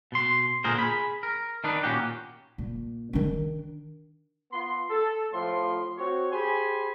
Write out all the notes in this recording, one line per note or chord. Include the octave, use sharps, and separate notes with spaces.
B2 C6
A#2 D3 G#4 A#4 C5
G#4 B5
A#4
D#3 D4 D#4 B4
A#2 A#3 C#4 F#4 G4
A#2
D#3 D4
B3 F4 C6
A4
A2 F3 C5 C6
C4 F#4 C#5
G4 G#4 C5 G#5 B5